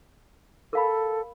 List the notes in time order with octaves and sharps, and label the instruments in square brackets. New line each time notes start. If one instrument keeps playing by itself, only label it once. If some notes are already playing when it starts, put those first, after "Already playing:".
[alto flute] A4 [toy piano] A#4 F5 B5